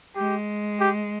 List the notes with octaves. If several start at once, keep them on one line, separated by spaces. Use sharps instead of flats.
G#3 G4
G4